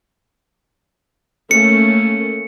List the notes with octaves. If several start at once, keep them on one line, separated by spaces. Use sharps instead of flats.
A3 A#3 C#4 C#7